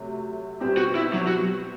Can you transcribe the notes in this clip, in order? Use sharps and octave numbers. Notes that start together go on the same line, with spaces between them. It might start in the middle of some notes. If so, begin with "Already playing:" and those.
Already playing: C3 F#3 A3
B2 G3 C4 G4
F#4
E4
F#3
F#4